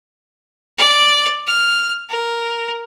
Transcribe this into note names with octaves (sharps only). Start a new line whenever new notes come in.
D5
F6
A#4